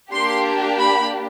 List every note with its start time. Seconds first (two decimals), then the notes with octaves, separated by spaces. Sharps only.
0.12 A#3 D4 G4 C6
0.80 B5